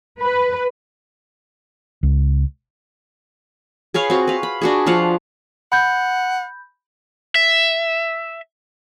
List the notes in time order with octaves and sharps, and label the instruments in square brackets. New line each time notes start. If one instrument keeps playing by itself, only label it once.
[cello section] B4
[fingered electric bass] C#2
[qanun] G#4 B4 C#5 F5
C4 F#4
B4 F5
B5
D4 F#4 G#4
F3 F4 F5 F#5
[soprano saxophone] F#5 [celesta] B5 G6
[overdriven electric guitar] E5